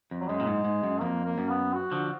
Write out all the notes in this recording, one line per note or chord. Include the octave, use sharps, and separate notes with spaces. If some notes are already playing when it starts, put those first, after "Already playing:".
F2
F#3
F#2 G#3
A#2
G#2
G#2
F#2
F2 A#3
A#3
F#2
B3
F#4
D3 F3